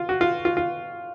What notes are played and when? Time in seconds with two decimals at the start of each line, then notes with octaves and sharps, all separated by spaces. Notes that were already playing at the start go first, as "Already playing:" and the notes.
Already playing: F4
0.09 F#4
0.21 F4
0.45 F4
0.57 F4